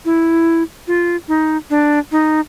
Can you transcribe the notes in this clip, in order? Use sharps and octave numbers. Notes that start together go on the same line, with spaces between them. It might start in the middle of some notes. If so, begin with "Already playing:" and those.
E4
F4
D#4
D4
D#4